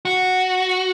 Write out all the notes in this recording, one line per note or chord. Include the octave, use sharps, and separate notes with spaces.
F#4